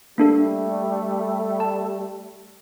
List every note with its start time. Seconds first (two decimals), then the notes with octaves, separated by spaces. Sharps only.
0.18 G3 A3 A#3 D4 A4
1.60 A5